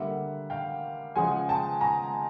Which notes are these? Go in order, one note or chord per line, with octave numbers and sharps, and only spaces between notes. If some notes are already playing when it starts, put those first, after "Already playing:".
Already playing: D3 G3 A#3 E5 F#5
F5 G5
C#3 F3 G#3 F#5 G#5
G5 A5
G#5 A#5